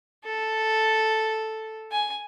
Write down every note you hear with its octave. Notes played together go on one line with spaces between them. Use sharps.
A4
G#5